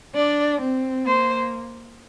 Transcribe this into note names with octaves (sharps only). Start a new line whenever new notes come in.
D4 D5
C4
A#3 C5